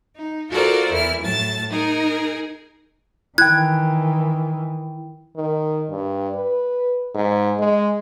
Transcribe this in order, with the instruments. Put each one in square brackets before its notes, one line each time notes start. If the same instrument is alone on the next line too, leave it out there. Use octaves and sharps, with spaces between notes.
[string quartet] D#4
F4 F#4 A4 A#4 C5 D5
E2 E4 F6
A2 F#3 A5 A6
D#4 G#4 A#4
[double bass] D#3 E3 [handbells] E4 G5 [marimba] F#6 [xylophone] G#6
[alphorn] D#3
G2
B4
G#2
G#3